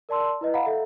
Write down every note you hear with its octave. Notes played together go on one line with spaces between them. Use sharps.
A#4 D5 A5 C6 E6
E4 B4 D#5
F5 F#5 A#5 B5
A4 E5